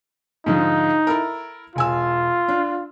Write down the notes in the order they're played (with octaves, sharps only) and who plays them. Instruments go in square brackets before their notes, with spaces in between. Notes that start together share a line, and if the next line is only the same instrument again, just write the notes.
[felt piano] G#2 D3 F3 [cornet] D#4
[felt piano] E4 A4 A#4
[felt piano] E1 G#5 E6 [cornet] F4
[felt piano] D4